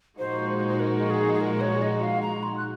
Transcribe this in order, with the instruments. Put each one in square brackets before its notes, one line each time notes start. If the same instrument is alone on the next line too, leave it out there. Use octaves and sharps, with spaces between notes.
[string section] A#2 F3 G#3 D#4 F#4 [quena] C5
[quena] C5
A#4
G#4
G#4
A#4
C#5
D#5
F5
A#5
C6
F#6